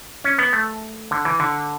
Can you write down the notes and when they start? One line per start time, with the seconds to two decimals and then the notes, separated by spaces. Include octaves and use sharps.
0.24 C#4
0.39 B3
0.53 A3
1.11 D3
1.25 E3
1.40 D3